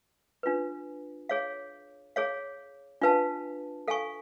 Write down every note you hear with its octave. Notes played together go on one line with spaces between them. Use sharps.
D4 F4 B4
G#4 C#5 F5
G#4 C#5 F5
D4 F4 B4 F5 A5
A4 F5 G#5 C#6